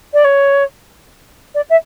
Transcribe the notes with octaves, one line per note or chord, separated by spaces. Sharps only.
D5
C#5
D5
E5